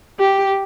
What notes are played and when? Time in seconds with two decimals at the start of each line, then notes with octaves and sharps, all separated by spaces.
0.20 G4